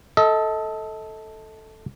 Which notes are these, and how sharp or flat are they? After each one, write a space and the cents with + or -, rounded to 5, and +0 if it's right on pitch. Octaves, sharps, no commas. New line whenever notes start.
A4 +0 D#5 +35